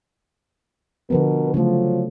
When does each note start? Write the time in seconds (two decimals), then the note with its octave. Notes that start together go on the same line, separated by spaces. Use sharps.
1.10 B2 D3 F3 B3 A#4 B4
1.54 C#3 F3 F#3 A3